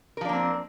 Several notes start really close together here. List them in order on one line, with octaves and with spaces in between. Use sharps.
A#4 F3 D4 A#3 C4